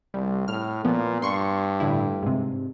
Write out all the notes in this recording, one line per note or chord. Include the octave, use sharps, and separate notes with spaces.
C2 G3
A2 F6
A#2 F3 B3
G2 C6 C#6
A2 D3 E4
G#2 C3